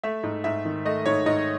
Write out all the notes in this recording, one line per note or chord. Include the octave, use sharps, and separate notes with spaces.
A3 E5
G#2
G#2 E5
D#3
A3 D#5
G#2 C#5
G#2 D#5